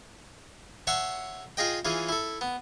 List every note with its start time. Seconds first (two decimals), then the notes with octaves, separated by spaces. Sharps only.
0.87 C#5 E5 F#5 A5 C6 C#6
1.57 F4 G#4 D#5 G5
1.85 E3 C#4 F4 G#4
2.09 E4 A4
2.41 B3